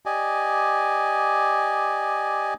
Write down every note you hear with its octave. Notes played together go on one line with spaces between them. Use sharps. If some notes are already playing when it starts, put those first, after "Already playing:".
G4 D5 D#5 G#5